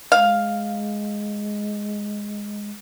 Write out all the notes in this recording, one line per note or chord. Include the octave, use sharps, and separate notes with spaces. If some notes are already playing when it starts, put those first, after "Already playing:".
G#3 F5